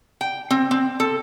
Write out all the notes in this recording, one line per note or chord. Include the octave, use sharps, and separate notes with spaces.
G5
C4
C4
A4